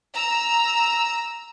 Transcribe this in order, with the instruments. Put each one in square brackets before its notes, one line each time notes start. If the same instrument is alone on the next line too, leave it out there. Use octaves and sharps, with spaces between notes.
[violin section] A#5 E6